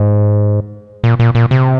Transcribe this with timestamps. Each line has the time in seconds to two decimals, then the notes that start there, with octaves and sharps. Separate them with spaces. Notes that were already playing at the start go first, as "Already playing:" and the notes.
Already playing: G#2
1.04 A#2
1.20 A#2
1.35 A#2
1.51 C3